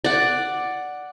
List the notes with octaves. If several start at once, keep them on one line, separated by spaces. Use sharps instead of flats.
D5 F#5